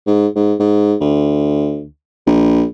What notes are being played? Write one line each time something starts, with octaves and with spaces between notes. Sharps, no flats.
G#2
G#2
G#2
D2
A#1